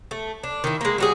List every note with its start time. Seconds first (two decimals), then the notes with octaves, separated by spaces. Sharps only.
0.11 A3
0.44 D4
0.64 D#3 E4
0.81 G#3 A#3
0.98 G3 F#4 G#4